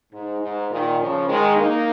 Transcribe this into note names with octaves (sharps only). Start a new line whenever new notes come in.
G#2
G#2
A#2 D#3
C#3 F3
D#3 G#3
A#3 D#4